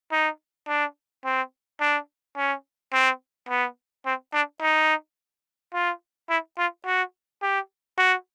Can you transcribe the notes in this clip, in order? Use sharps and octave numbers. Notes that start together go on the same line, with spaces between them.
D#4
D4
C4
D4
C#4
C4
B3
C4
D4
D#4
F4
E4
F4
F#4
G4
F#4